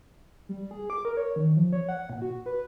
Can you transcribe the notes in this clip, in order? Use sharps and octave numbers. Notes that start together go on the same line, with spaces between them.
G3
G#4
D6
A#4
C#5
D#3
F3
C#5
F#5
A#2
F#4
B4